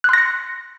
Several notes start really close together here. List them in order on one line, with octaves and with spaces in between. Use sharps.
F#6 C6 A#6 C#7